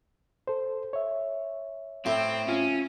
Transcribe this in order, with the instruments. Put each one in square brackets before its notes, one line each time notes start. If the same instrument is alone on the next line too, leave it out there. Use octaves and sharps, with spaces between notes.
[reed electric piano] A4 C5
C#5 E5
[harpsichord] A2 [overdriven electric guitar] C4
[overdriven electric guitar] C#4 [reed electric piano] F4